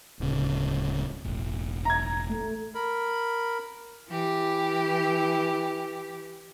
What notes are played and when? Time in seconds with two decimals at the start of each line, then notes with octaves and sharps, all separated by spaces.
0.20 D1 C#3
1.25 E1 A1
1.85 A#5 G#6
2.30 A3
2.75 A#4 B5
4.09 E3 G4